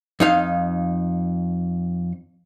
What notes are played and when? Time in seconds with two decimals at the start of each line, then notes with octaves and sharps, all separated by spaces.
0.20 F2 D#4 F5